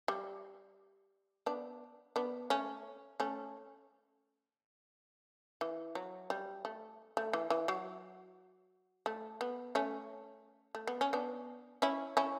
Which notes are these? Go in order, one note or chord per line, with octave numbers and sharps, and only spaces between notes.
G3
B3 D4
B3 D4
A3 C#4
A3 C#4
E3
F#3
G3
A3
A3
E3
E3
F#3
A3
B3
A3 C#4
A3
B3
C#4
B3 D4
C#4 E4
C#4 E4